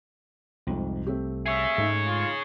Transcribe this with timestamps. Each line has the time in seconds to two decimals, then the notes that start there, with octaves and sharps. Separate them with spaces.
0.67 C2 F2 G#2
1.07 A3 C4 G4
1.46 G#4 C#5 E5
1.78 G#2 G#3 A3 D#4 D#5
2.07 F4